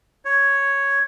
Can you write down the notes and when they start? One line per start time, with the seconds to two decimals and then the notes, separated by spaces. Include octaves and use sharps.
0.25 C#5